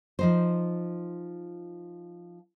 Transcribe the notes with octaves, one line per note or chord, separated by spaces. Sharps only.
F3 D#4 C5